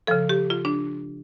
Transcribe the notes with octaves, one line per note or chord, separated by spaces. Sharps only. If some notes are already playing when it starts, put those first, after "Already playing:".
C#3 F3 A4
G4
F4
D4